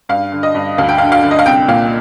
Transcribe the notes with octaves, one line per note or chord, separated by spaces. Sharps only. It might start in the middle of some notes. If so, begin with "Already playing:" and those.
G2 F5
D3
D#5
G2
D2 F5
G5
F5
D3
F5
D3
D#5
F5
C2 G5
A#2 F5